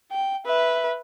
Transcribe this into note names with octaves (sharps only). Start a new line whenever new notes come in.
G5
B4 E5